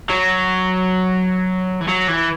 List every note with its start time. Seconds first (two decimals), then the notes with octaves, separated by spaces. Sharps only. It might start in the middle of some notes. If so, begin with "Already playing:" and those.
0.10 F#3
1.81 E3
1.88 F#3
2.08 E3